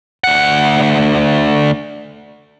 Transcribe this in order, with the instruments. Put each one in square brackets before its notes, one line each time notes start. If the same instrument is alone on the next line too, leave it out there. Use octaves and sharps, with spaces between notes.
[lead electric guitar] D2 F#5